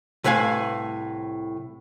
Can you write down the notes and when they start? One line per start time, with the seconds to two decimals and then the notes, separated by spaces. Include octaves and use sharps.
0.24 C2 A2 B4 F5 G#5